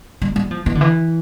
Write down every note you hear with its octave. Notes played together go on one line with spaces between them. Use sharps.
G3
G3
F3
E3
D3
E3